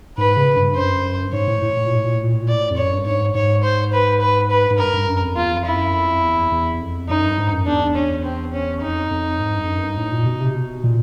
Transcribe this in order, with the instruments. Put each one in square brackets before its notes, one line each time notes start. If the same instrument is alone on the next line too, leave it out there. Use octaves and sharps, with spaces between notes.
[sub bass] G#2 [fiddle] B4
[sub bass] C#3
G2
[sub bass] F#2 [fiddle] C5
[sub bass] G2
[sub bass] G#2 [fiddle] C#5
[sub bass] A2
A2
A2
A#2
A2
A#2
A2
A#2
A2
A#2
[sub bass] A2 [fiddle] D5
[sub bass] F2
[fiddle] C#5
[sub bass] F#2
G2
[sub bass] G#2 [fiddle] C#5
[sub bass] G#2 [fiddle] C#5
[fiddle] C5
B4
B4
B4
[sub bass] G#2
[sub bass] G2 [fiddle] A#4
[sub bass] G2
F#2
F2
[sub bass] E2 [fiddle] F4
[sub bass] F2
[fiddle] E4
[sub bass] F#2
F2
E2
E2
F2
[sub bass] F#2 [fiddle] D#4
[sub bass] G2
G#2
F#2
[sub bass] E2 [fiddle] D4
[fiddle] C#4
C4
C#4
[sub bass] F2 [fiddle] D#4
[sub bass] F2
G#2
G2
F2
F#2
G2
A2
A#2
B2
C3
B2
A#2